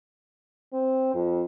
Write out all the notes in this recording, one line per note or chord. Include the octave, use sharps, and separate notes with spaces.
C4
F2